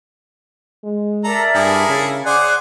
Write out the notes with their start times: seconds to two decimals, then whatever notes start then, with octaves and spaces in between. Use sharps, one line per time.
0.84 G#3
1.24 A4 A#4 D5 E5 A#5
1.54 G2 E4 G#4 A4
1.89 C#3
2.26 G#4 C5 D5 F#5 G#5 D6 F#6